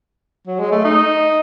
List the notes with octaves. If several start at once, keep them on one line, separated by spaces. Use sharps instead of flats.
F#3
G#3
A3
D#4